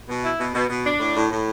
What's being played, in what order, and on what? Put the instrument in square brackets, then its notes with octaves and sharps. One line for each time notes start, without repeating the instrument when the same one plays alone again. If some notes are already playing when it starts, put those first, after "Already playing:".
[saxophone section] B2
E4
B2
B2
B2
D4
A2
A2
A2